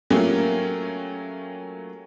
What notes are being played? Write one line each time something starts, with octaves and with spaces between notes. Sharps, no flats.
F#3 A3 A#3 C#4 F4 G4